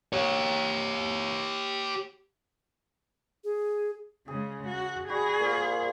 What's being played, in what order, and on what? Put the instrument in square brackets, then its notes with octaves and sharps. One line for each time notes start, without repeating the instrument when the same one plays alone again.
[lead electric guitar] G4 C#5
[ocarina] G#4
[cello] C#3 G#3 [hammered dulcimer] G#4
[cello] F#4
[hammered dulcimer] G3 F#4 B5 [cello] G#4
[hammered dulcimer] A#2 C5 F5